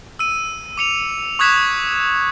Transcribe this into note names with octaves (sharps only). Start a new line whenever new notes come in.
E6 D#7
D6 C#7 F7
C#6 D#6 F#6 G#6 B6 E7